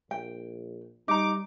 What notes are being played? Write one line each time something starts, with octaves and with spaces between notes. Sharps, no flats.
A#1 G5
G3 D#4 A#5 D6